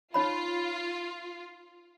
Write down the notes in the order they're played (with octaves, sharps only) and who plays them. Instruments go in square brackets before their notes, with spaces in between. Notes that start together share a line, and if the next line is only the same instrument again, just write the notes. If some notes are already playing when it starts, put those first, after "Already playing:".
[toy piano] D#4 C#5 B5 [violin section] F4